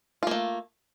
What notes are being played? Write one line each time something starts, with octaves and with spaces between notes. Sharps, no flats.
A3 A#3 F4